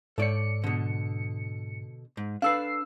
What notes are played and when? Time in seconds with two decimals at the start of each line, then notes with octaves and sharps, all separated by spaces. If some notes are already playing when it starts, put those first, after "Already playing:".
0.18 G#2 A4 C#5 D5 C#7
0.64 B2 D3
2.17 G#2
2.42 D4 A4 B4 F5 E6 C7